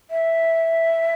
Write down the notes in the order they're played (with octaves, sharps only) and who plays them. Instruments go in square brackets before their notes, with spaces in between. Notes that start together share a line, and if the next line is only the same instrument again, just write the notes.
[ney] E5